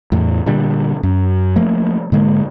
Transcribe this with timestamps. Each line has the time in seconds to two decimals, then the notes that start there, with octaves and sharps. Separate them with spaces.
0.12 E2 A2
0.46 A#2 D3 G3
1.03 F#2
1.56 F3 A3 A#3
2.12 G#2 D3 G#3 A#3